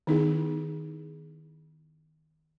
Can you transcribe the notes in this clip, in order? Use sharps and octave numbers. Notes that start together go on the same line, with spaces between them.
D#3 B3 D#4 E4 G#4